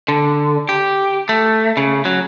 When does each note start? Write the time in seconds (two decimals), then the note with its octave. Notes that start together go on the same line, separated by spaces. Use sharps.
0.08 D3
0.69 G4
1.29 A3
1.77 C#3
2.05 F#3